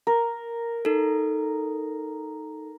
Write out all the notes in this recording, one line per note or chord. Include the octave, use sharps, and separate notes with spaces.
A#4
D#4 A4